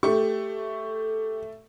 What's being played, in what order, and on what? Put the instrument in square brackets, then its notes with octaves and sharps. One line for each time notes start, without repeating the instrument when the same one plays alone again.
[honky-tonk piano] A3 C#6 [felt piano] G4